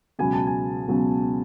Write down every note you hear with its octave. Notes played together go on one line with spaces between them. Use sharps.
C#2 B2 F#3 B3 G#5
A5
G#5
C#2 B2 F#3 B3